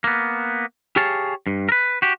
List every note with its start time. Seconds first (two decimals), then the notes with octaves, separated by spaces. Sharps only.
0.04 A#3 B3
0.96 G4 G#4 C#5 F5 A5
1.47 G2
1.69 A#4 B4
2.02 F#4 G4